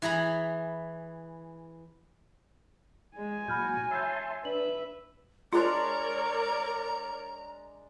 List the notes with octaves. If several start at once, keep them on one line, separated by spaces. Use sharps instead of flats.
E3 G#4 A#5 B5
G#3 G#5
A#2 F#3 F#4 B5 F6 G6
C#5 E5 A5 C6 E6 G6
D4 B4 E5 F#7
G#3 D4 F4 A#4 C#5 D5 A5 A#5